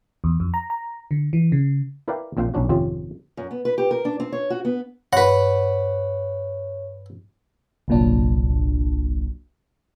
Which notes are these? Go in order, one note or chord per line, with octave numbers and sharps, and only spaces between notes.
E2
F2
A#5
A#5
D3
E3
C#3
E4 A#4 B4 D5 F5 G5
A#1 A#2 C4 F5 G5
B1 C#4 D4 F#4
G#1 F2 C3 C4 C#4 F4
F#2
B3
B4
G4
A#4
D4
C4
C#5
F#4
B3
G2 B4 C#5 F#5
G1 C2 A#2 F#3 D4